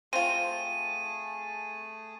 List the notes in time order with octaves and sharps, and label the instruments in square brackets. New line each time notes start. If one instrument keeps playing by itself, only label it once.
[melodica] A3 G#4 A5 [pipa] C4 F4 [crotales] D#7